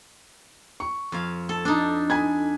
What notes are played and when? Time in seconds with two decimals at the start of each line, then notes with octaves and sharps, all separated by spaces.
0.80 C#6
1.12 F2 F5
1.49 A4
1.65 D4 D#4
2.10 G#5 B5 G#6